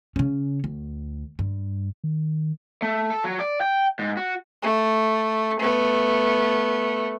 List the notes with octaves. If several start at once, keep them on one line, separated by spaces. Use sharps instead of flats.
C#3 C#4
D2
G2
D#3
A3
A4
F#3
D5
G5
G#2
F#4
A3
A3 B3